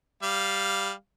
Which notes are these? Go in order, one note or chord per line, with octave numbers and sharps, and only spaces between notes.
G3 F5